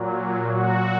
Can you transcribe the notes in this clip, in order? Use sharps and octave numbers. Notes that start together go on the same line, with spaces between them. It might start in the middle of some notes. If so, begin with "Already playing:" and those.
Already playing: A#2 F#3
F#4